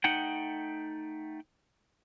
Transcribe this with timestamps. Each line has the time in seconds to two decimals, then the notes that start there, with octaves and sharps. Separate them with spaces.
0.04 A3 D#4 F#5 G5